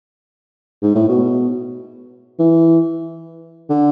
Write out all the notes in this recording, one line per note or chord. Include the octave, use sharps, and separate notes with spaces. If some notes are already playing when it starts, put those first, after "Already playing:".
G#2
A2
B2
E3
D3